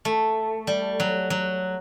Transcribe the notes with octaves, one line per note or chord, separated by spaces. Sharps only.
A3
G3
F#3
F#3